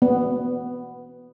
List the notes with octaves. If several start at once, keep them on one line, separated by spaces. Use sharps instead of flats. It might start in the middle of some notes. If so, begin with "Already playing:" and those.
B3